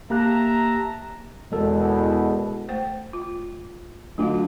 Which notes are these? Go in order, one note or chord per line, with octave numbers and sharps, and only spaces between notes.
A#3 G4 E5 A5 A#5 F#6
E2 B2 G#3 A4 A#4
A3 C5 G5
F4
D2 F#3 F4 F5